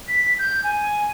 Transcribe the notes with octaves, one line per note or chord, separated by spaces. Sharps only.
B6
G6
G#5